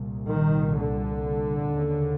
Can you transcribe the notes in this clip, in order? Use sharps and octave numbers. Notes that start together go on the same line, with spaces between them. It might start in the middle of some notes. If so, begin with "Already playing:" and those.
Already playing: C2 A#2
D#3
D3
D#2 C#3